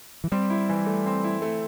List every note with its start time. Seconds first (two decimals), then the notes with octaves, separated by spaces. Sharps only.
0.24 E3
0.32 G3 C4
0.50 E4
0.69 E3
0.87 A3
1.06 C4
1.24 E4
1.42 A3